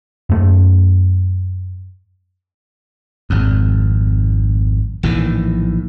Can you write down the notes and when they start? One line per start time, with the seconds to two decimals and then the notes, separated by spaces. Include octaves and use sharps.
0.30 F#2 A3
3.30 G#1 F2
5.03 A#1 A2 D#3 E3